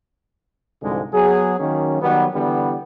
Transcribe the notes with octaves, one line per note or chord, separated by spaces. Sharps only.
C2 G#2 D3 F3 G#3
F#3 B3 G#4
D#3 F#3 A#3 C#4
D#3 F#3 G3 B3
D3 E3 G3 B3